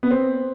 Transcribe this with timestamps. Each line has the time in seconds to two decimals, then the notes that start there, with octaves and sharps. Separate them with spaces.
0.03 B3
0.11 C4